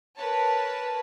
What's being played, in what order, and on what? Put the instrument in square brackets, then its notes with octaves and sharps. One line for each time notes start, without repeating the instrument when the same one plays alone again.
[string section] A#4 B4 C#5 A5